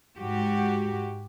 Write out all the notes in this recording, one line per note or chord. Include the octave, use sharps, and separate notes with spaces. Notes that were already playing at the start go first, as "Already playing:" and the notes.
G#2 F#4 G4